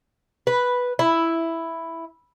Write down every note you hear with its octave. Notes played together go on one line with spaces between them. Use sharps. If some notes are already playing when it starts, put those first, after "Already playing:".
B4
E4